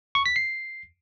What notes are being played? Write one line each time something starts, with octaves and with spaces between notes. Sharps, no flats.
C#6
B6
C7